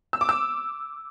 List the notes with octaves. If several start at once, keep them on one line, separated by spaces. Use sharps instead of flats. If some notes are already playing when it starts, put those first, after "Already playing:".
E6
D6
E6